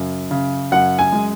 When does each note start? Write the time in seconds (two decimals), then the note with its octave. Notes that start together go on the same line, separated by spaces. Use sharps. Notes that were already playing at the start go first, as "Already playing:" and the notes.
Already playing: F#2 C#3
0.31 C#3
0.71 F#2 F#5
0.99 G#5
1.12 G#3